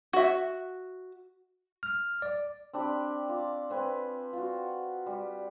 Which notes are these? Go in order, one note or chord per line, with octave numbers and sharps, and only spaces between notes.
F#4 E5
F6
D5
C4 D4 G4 B5
F4 D6
C4 B4 G#5
F4 F#4
G3